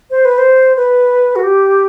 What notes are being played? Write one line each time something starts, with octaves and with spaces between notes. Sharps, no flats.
C5
B4
C5
B4
F#4
G4